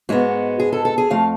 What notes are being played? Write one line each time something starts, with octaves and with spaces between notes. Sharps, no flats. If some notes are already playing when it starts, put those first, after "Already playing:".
G#2 G#3 B3 F#4
G#4
A4
A4
G#4
F2 F3 A3 F5